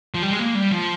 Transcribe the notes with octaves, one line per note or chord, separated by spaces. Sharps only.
F3
G3
G#3
A#3
G3
F3